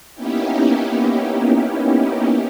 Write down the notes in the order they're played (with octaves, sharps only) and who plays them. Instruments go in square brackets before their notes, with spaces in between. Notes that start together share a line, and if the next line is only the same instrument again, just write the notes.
[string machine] A#3 B3 C#4 D#4 E4 G4